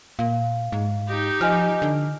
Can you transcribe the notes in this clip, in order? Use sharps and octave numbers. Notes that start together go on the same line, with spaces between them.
A#2 F5
G#2
D#4 G4
F3 D#5 G#5 F6
D3